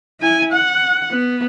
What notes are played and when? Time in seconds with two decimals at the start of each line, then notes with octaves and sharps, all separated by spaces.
0.20 E4 G#5
0.52 F#5
1.11 B3